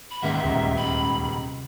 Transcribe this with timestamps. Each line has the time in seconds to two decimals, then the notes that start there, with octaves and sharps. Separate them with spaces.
0.10 B5
0.22 C#2 G#2 D#3 E5 F#5
0.44 D#1 D2 A#5
0.77 B5
1.24 C3